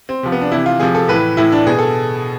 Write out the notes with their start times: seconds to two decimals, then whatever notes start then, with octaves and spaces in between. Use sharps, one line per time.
0.09 C4
0.23 C3 F3
0.32 B3
0.42 D4
0.52 C3 E3 E4
0.66 F4
0.80 C3 F3 G#4
0.95 A4
1.08 A2 E3 B4
1.37 A2 E3 E4
1.52 D4
1.67 B2 G#4
1.78 A4